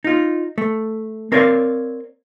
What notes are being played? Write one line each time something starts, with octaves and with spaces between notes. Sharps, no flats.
D#4 F4
A3
C4 A#4 C#5 D5 E5 F5